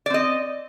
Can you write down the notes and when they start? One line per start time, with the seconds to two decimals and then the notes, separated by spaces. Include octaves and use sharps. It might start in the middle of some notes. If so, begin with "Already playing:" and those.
0.06 D5
0.10 C4
0.14 D#5